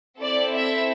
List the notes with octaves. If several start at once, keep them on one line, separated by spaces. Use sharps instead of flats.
C4 E4 A4 D5
E5